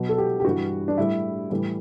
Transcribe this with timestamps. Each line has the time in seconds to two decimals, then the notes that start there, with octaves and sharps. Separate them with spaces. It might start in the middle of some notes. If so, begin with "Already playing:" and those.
Already playing: B2 F#3
0.09 A4
0.18 G4
0.40 G4
0.45 G2 E3 G3 F#4
0.88 D4
0.98 A2 G3 E4
1.50 A2 E3 G3